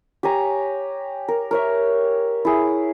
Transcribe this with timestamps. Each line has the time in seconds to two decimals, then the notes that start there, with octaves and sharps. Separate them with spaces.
0.23 G4 C#5 G#5 A#5
1.28 A#4
1.51 A#4 C#5 E5
2.45 E4 G#4